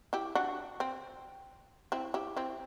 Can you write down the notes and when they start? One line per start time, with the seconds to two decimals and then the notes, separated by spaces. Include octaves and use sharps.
0.13 E4 G4
0.35 D4 F#4
0.80 C4
1.92 C4 E4
2.14 E4 G4
2.37 C4 E4